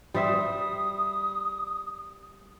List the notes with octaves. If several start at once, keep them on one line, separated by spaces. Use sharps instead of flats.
G3 C5 E5 D#6